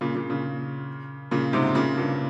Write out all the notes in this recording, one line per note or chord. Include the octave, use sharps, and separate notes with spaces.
A#2 C#3
A#2 C#3
A#2 C#3
A#2 C#3
G#2 C3
A#2 C#3
G2 A#2